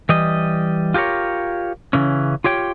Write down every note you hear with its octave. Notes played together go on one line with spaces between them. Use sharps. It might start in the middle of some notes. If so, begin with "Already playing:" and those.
E3 G3 D#5
F4 G4 A4 A#4 C#5
C#3 E3 C#4
F4 G4 C#5 G5